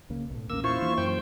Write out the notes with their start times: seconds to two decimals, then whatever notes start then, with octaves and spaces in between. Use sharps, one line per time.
0.10 C#2 C#3 A#3
0.30 B1 A2
0.50 E2 A#2 A#3 C#4 E6
0.64 E4 F4 C5 C#6
0.82 E3 A#3 D4
0.98 F#2 C5 G5